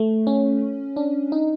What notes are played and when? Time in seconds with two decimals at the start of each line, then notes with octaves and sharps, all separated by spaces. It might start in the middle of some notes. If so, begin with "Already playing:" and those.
Already playing: A3
0.27 C#4
0.96 D4
1.32 D#4